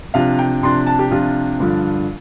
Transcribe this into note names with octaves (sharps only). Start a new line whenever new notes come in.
C3 F3 D4 F5
G5
C3 F3 D4 C6
A5
G4
C3 F3 D4 F4
G2 D3 F3 D4